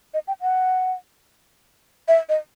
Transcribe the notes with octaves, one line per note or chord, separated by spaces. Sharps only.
D#5
G5
F#5
E5
D#5